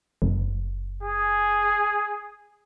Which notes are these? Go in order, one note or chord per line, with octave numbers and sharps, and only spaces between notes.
F#1
G#4